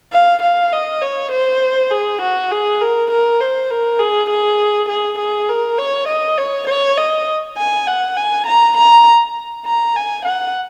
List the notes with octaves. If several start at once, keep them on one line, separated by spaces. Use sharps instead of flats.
F5
F5
D#5
C#5
C5
G#4
F#4
G#4
A#4
A#4
C5
A#4
G#4
G#4
G#4
G#4
A#4
C#5
D#5
C#5
C#5
D#5
G#5
F#5
G#5
A#5
A#5
A#5
G#5
F#5